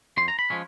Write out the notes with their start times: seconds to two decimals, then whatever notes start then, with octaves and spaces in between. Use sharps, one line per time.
0.17 F2 C6
0.28 A#5
0.39 B5
0.50 F3 G#3 C#4